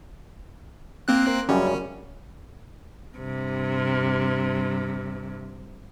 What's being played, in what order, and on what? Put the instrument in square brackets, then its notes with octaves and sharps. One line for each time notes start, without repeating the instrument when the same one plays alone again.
[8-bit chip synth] A#3 C4 F#6
[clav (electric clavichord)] F#2 C#3 G3 [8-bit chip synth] C#4
[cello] G2 C3